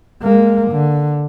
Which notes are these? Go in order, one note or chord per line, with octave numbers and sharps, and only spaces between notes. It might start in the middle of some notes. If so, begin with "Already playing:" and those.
G#3 A#3
D3